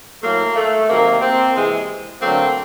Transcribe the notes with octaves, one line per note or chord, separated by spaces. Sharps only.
A2 F#3 A3 A#3
A3
C3 D#3 F#3 A#3
A#3 C4
C3 E3 G#3
D3 F#3 A3 A#3 C4